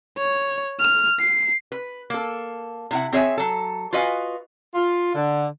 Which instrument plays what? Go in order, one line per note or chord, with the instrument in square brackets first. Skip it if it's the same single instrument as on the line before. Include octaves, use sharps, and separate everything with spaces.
[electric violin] C#5
F6
C7
[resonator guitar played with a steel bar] B4
A#3 A4
C3 E4 F#5
C4 G#4 C#5 E5 G#5
F#3 A4
F4 F#4 B4 D#5 F5 G#5
[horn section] F4
D3